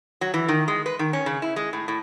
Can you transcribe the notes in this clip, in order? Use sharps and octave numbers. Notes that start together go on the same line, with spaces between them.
F#3
E3
D#3
G#3
B4
D#3
C#4
C#3
E4
G#3
A2
A2